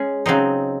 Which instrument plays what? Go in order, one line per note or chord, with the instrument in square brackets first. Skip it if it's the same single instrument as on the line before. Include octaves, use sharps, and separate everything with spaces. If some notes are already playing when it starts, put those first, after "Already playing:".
Already playing: [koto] G#3 C#4 G#4
C#3 F#3 C4 D#4